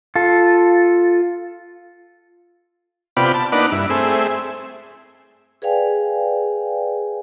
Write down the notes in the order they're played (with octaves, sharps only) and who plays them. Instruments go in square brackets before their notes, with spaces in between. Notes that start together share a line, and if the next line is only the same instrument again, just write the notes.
[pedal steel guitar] F4 A4
[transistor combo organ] C3 B3 F4 G4 D5 B5
A5
A#3 D4 D#4 B4 D5 F#5
G2 E4
A3 C4 G#4 E5
[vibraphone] G#4 B4 D5 F5 G5 G#5